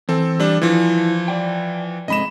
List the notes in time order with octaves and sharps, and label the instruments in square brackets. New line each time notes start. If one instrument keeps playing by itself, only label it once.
[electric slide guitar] E3 [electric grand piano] C4 A4
[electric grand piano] G3 D4
[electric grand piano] E3 F3 [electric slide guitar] E4
[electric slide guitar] D5 G5
[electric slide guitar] G#2 C3 G#3 [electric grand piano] D#5 B5 E7